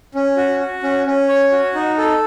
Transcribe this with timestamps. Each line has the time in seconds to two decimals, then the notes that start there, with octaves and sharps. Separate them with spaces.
0.15 C#4
0.37 F#4
0.60 F#4
0.83 C#4
1.07 C#4
1.28 C#5
1.52 F#4
1.75 D#4
1.98 A4